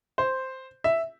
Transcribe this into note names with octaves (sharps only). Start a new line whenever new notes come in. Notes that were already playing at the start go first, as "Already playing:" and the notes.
C5
E5